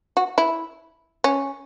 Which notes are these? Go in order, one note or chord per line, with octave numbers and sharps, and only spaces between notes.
F#4
E4
C#4